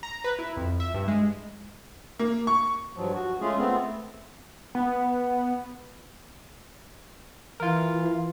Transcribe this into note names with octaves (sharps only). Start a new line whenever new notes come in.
A#5
B4
E4
F2
E5
G2
G#3
A#3
C#6
G2 F3 F#3
F#4
G#3 A3 C#4 F4 G#4
A3 B3 C4
B3
E3 F4 A#4